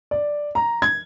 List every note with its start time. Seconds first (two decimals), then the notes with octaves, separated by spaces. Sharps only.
0.11 D5
0.55 A#5
0.82 G#6